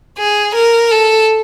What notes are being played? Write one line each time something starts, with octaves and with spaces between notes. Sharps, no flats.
G#4
A#4
A4